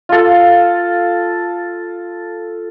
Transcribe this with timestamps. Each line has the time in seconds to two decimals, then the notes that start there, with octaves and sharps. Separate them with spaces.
0.09 F4 A4